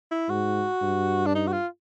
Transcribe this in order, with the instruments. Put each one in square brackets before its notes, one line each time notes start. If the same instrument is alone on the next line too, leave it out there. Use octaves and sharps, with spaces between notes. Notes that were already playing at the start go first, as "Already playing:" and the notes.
[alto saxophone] E4
[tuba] G#2 [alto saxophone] F#4
[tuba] G2
[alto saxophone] D4
D#4
F#4
F4